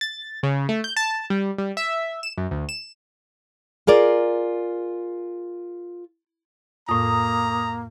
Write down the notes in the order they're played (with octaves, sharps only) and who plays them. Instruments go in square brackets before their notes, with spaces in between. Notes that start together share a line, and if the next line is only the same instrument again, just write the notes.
[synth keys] A6
C#3
A3
G6
A5
G3
G3
E5
E7
F#2
D2
E7
[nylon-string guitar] F4 G#4 A#4 D5
[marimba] F2 A2 [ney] A#3 [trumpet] A#5 [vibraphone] D#6